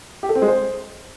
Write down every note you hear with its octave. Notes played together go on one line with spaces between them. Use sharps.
G4
A4
C4
G#3
C5